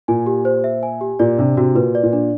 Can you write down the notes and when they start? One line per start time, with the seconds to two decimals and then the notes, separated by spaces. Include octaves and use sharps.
0.08 A#2 G#5
0.26 G4
0.45 C5
0.64 E5
0.83 G#5
1.01 G4
1.19 A#2 D5
1.38 C3 D4
1.57 C3 F#4
1.75 A#2 B4
1.95 D5
2.03 A#2
2.13 D4